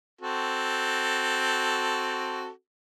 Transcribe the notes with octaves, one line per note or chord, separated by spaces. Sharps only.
C4 F#4 A4